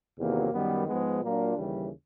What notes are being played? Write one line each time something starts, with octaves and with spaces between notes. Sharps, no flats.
E2 C3 D#3 F#3 A#3
F#2 D#3 G3 B3
G#2 F3 G#3 B3
A#2 F#3 A#3 D4 F4
D#2 C#3 E3 G3